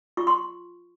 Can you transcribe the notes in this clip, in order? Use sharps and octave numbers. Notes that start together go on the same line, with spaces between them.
F4 C#6
C6